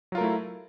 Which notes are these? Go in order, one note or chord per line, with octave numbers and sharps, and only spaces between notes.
F#3 A3 E4 F4 A#4